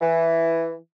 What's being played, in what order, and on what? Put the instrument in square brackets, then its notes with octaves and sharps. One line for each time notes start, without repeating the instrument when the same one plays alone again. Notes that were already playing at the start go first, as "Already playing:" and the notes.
[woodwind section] E3